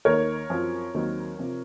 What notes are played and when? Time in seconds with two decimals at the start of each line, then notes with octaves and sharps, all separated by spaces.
0.05 D#2 D#3 A#3 A#4 C#5
0.50 F#2 F3 C4
0.94 D#2 D#3 F#3 C4
1.39 C3 F3